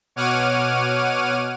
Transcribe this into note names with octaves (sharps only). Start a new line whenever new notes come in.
B2 C#5 F#5 D6 F6 D#7